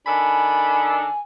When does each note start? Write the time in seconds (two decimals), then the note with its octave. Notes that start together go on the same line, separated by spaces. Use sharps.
0.06 D#3 D4 A4 G#5 B5